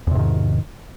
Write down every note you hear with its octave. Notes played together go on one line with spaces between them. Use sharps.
E2 G#2 C3 D#3